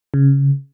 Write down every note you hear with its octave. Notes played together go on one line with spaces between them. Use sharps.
C#3